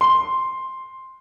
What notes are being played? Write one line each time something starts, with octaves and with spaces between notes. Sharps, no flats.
C6